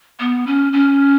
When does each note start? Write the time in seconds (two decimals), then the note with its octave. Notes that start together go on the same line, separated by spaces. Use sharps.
0.20 B3
0.47 C#4
0.73 C#4